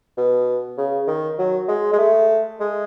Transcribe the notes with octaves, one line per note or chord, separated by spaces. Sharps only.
B2
C#3
D#3
F#3
G#3
G#3
A3
G#3